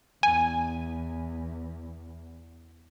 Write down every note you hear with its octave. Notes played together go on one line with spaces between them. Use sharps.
E2 G#5